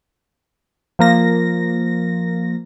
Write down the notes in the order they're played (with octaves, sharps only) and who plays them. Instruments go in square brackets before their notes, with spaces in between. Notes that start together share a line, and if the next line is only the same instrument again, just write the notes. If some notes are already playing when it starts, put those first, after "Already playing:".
[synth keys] F3 A#3 A#6